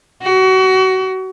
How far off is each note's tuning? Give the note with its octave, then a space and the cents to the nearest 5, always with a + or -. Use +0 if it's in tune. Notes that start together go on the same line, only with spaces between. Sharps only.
F#4 +30